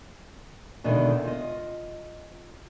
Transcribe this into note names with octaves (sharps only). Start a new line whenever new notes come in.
E2 B2 D3 D#3 G#3 B3
F4 D#5